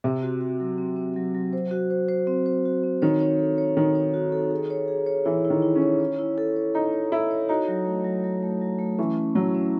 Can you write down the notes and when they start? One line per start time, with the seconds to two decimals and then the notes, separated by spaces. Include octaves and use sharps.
0.04 C3 C4
0.23 F#4
0.41 F#4
0.60 F#3
0.78 C4
0.97 C4
1.16 F#3
1.35 F#3
1.53 C5
1.71 F#4
1.90 C5
2.09 C5
2.27 C4
2.46 C5
2.65 F#4
2.83 C4
3.02 D#3 C#5
3.20 C#5
3.39 A4
3.58 C#5
3.77 D#3 D#4
3.95 C#5
4.14 F#4
4.32 A4
4.51 G#4
4.70 C#5
4.88 G#4
5.06 C#5
5.25 E3 E4
5.45 E4
5.50 D#3
5.62 E4
5.75 C#4
5.82 C#5
6.00 C#5
6.19 E4
6.38 A4
6.56 C#5
6.74 D#4 A4
6.93 C#5
7.12 E4 A4
7.31 C#5
7.49 D#4 F#4
7.68 F#3
7.86 A3
8.04 F#3
8.24 F#3
8.43 A3
8.61 F#3
8.79 A3
8.99 E3 C#4
9.17 C#4
9.35 F#3 E4
9.55 C#4